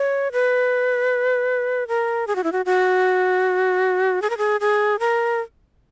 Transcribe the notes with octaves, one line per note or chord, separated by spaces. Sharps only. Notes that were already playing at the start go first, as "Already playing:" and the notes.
Already playing: C#5
B4
A#4
G#4
F#4
E4
F#4
F#4
G#4
A#4
G#4
G#4
A#4